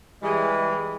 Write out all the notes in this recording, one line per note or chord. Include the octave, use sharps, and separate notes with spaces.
E3 G3 G#3